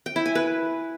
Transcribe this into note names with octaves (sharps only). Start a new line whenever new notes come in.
G5
E4
G#5
B4